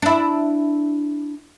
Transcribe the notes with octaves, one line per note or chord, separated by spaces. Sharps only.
D4 E4